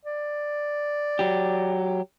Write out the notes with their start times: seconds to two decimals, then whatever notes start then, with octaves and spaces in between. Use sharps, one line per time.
0.05 D5
1.19 F#3 G4